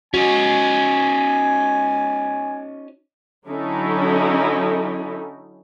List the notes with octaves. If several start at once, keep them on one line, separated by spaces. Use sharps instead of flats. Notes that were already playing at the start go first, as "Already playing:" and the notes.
C#4 D#4 F#4 G#5
D3 F#3 C#4 D#4 E4 A4